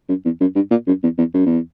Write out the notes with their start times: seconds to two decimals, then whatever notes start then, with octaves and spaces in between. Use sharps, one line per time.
0.08 F#2
0.25 E2
0.40 F#2
0.55 G2
0.71 A#2
0.87 F#2
1.03 E2
1.18 E2
1.34 F#2
1.46 E2